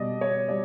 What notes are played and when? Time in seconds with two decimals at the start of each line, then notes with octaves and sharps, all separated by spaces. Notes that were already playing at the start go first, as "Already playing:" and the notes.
Already playing: B2 G3 D5 D#5
0.21 C#5
0.49 G3 D5